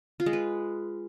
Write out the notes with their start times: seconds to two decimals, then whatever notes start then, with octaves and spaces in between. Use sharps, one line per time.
0.20 F4
0.26 G#3
0.33 B4